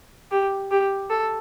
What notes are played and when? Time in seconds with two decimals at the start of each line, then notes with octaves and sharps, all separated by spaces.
0.31 G4
0.71 G4
1.10 A4